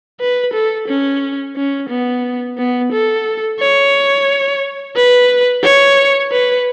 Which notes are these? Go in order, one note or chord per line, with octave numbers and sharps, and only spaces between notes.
B4
A4
C#4
C#4
B3
B3
A4
C#5
B4
C#5
B4